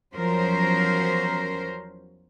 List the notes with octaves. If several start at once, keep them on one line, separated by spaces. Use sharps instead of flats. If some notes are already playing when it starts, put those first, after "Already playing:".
E2 F3 F#3 C#4 A#4 C5